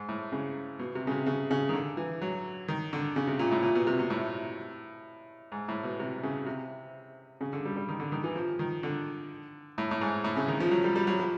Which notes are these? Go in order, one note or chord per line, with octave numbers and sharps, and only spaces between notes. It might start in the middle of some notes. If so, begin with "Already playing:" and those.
Already playing: G#2
A2
C#3
B2
C3
C#3
C3
C#3
C#3
D#3
D3
E3
F#3
D#3
D3
C#3
C3
A#2
A2
A#2
B2
C3
B2
A2
G#2
A2
B2
C3
C#3
C3
C#3
D3
G3
G3
D#3
D3
D#3
E3
F3
D#3
D3
A2
A2
G#2
A2
C#3
D#3
F3
F#3
G3
G3
F#3
F3